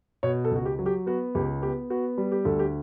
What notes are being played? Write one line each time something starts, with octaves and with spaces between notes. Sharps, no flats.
B2 C#5
A4
C#2 F#4
G4
F#3
G4
B3 F#4
C#2 G4
B3 G4
B3 F#4
G3
G4
D2 A4
G4